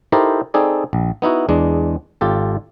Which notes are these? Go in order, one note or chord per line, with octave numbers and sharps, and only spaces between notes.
D#4 E4 G4 A4 A#4 C5
C4 D#4 G#4 A4 D5
A#1
B3 D#4 E4 F#4
E2 G#3 D4
G#1 F4 G4 A4